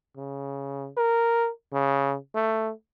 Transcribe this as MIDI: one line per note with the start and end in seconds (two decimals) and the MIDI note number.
0.17 0.89 49
0.97 1.49 70
1.72 2.16 49
2.35 2.72 57